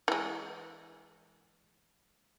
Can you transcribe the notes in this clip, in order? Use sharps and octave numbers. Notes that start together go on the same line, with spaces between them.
E3 G#3